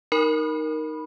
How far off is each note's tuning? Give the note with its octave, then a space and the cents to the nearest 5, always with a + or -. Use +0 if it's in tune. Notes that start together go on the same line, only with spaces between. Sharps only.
D#4 +0 A#4 +0 B5 -10